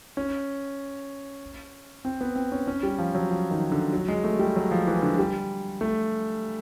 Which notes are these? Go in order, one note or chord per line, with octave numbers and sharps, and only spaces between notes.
C#4
C4
B3
C4
C#4
C#4
G3
F3
F#3
F3
D#3
D3
F#3
G#3
A3
G3
F#3
F3
E3
D3
G3
A3